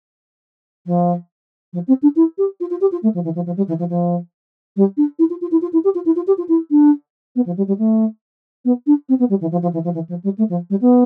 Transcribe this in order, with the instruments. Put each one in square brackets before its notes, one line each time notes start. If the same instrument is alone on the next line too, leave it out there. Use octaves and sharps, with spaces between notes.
[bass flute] F3
F3
C4
D4
E4
G4
F4
F4
G4
F4
A3
F3
E3
F3
F3
G3
E3
F3
F3
G3
D4
E4
F4
F4
E4
F4
E4
G4
F4
E4
F4
G4
F4
E4
D4
B3
F3
G3
G3
A3
B3
D4
C4
B3
G3
E3
F3
F3
E3
F3
E3
F3
G3
A3
F3
G3
B3